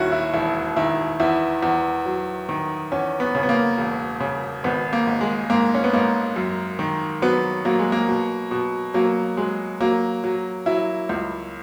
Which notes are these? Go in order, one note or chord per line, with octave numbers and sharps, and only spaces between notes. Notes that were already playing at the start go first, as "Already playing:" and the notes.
Already playing: D#2 D#3 C#4 E4 F#4
E4
E1 E4
D#3 E4
E2 E4
E2
F#3
D#3
E2 C#4
B3
C#3
B3
A#3
E1
C#3
G#1 B3
A#3
G#1
G#3
G#2 A#3
C#4
B3
G#2 A#3
F#2
D#3
F#3 B3
F#3 A#3
G#3
A#3
B2
B2
F#3 A#3
F#3 G#3
F#3 A#3
F#3
F#3 E4
C#2